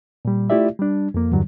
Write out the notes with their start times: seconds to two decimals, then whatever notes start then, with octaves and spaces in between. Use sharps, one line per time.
0.25 A#2 G3
0.50 A3 E4 F4 G4 D5 E5
0.79 G3 D4
1.14 F2 A#3
1.32 E2 G2 D3 F#3 G3